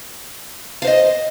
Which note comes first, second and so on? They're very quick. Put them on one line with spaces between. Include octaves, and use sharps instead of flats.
F5 C5 D#5